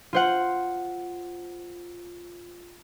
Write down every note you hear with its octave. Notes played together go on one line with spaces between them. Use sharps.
F4 C5 F#5